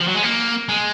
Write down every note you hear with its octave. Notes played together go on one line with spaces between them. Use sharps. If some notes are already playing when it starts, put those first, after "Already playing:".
F3
F#3
G#3
A#3
G#3